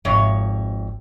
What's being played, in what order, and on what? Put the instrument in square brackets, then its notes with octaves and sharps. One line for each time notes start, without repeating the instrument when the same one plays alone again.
[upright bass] G#1 [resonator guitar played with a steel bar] F2 C3 C#5